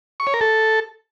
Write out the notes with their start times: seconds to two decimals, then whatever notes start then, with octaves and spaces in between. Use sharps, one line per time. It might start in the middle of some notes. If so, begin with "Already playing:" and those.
0.20 C#6
0.27 C#5
0.34 A#4
0.41 A4